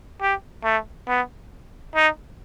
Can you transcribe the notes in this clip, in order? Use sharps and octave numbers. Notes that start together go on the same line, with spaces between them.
G4
A3
B3
D#4